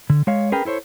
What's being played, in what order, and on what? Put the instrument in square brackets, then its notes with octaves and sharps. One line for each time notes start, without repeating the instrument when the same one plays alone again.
[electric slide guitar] D3
G#3 C#5 F5
C#4 G#4 A#4 B4 G5
E4 A4 C5 C#5